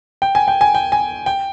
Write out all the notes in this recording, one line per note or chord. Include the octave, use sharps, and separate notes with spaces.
G5
G#5
G5
G#5
G5
G#5
G5